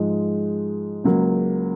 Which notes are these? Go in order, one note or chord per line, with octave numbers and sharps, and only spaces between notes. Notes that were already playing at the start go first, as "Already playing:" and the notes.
Already playing: G#2 F3 G#3
C#2 C#3 F#3 A#3